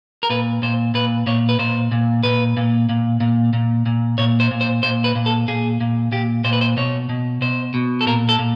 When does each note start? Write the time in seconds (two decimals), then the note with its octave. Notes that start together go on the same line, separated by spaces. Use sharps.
0.23 A#4
0.30 A#2 B4
0.62 A#2 C5
0.94 A#2 B4
1.27 A#2 C#5
1.49 B4
1.59 A#2 C5
1.92 A#2
2.23 A#2 B4
2.57 A#2
2.89 A#2
3.20 A#2
3.53 A#2
3.86 A#2
4.18 A#2 C#5
4.40 C5
4.51 A#2
4.61 C5
4.83 A#2 C5
5.04 B4
5.15 A#2
5.26 A4
5.48 A#2 G#4
5.81 A#2
6.12 A#2 G4
6.45 A#2 C5
6.53 B4
6.61 C5
6.77 B2 C#5
7.09 B2
7.41 B2 C5
7.74 B2
8.01 A4
8.07 A#2 A#4
8.29 A4
8.39 A#2